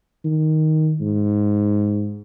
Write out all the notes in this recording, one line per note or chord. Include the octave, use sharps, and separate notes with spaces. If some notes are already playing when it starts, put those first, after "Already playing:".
D#3
G#2